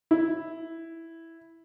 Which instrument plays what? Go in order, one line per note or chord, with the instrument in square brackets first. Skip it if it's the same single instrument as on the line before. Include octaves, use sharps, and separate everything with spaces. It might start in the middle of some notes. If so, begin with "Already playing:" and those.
[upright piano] E4